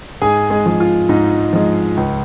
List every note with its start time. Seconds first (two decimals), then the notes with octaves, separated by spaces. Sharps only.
0.22 G#2 G#4 G#5
0.50 G#3 G#4
0.66 F3 G#3
0.80 F4
1.09 G#2 D#4
1.53 F3 G#3
1.97 C#2